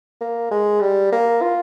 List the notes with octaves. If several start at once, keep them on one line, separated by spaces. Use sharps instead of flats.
A#3
G#3
G3
A#3
F4